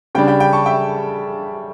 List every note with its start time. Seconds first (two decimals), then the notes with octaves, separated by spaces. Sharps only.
0.15 C#3 G3 D4 G5 B5
0.28 G5 B5
0.40 G5 B5
0.53 A5 C#6
0.66 E5 G5